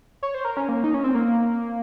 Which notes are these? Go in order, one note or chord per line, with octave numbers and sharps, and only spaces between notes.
C#5
C5
A#4
C#4
A#3
D#4
C#4
C4
A#3